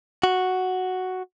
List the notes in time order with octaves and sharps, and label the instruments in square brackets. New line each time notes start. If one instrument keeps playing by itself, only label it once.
[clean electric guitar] F#4